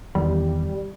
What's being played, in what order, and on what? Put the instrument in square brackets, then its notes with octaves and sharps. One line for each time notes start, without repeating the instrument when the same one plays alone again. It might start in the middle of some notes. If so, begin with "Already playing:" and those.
[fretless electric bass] E2 D#3 [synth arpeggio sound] G3